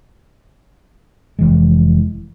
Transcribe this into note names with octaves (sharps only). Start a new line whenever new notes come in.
F1 E3 G#3